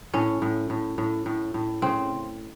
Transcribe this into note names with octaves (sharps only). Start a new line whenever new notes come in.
A2 C#4
A2
A2
A2
A2
A2
C#3 C4